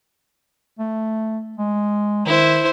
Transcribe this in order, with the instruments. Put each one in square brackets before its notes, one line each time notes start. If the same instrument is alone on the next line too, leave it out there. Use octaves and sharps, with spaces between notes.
[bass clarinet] A3
G#3
[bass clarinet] D#3 [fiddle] E4 C5